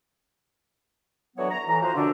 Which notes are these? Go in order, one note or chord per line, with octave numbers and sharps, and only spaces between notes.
D3 E3 F#3 B3 F#4 C#5
A#5
A2 E3 A#5
F3 D#4 F#4 C5
F#2 B2 D3 D4